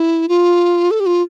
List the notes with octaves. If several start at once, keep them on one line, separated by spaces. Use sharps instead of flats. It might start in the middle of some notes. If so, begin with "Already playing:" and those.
Already playing: E4
F4
A4
G4
F4